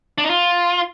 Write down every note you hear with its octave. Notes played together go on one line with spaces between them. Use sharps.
D4
D#4
F4